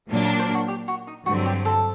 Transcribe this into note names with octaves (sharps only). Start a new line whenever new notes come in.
A#2 F#3 A#3 D4
A#5
C5
F#4
G4
F#4
D#4
G2 D3 F#3 C4 F#4
G4
A4